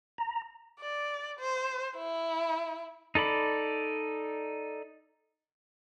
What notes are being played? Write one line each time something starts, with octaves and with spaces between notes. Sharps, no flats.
A#5
D5
C5
E4
D#4 A4 D5 B5